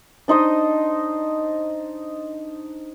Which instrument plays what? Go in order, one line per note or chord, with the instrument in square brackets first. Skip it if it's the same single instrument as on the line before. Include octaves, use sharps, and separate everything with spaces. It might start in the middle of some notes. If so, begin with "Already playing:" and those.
[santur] D4 D#4 C5 D#5